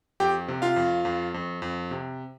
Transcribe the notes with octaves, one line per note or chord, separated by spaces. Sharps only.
F2 G4 G5
C3
F4 F5
F2
F2
F2
F2
C3